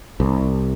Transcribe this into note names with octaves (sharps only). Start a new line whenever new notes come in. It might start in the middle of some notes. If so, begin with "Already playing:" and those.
C2